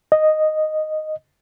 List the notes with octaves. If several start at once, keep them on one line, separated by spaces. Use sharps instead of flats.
D#5